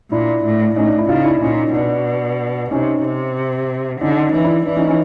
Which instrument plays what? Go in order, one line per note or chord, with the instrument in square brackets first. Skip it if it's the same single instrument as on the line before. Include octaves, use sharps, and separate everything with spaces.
[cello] A#2 [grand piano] D4 E4
[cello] A2
[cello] A2 [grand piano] C#4 D#4
[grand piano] D4
D4 E4
[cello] C#3 [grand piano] D#4 F4
[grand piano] D4 E4
[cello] A#2 [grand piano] C#4 D#4
[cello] B2 [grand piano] D4
[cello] C3 [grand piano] C#4 D#4
[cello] C3
[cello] D3 [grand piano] C#4 D#4
[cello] E3 [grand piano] C#4 D#4
[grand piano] D4 E4
[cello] E3 [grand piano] D4
[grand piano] C#4 D#4
C#4 D#4